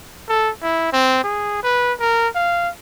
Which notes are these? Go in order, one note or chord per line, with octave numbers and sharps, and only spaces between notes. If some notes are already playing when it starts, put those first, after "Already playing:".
A4
E4
C4
G#4
B4
A#4
F5